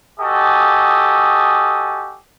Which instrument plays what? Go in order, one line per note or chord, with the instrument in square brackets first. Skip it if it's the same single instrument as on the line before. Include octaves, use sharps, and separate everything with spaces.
[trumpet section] F#4 G4 A4 D#5 G#5 D#6